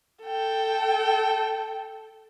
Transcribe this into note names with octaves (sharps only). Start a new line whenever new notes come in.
A4 G5